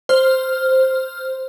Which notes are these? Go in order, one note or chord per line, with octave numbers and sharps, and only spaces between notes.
C5 F6